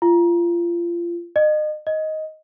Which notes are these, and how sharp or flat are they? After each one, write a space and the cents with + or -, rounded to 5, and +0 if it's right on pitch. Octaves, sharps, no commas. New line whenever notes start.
F4 -25
D#5 -35
D#5 +10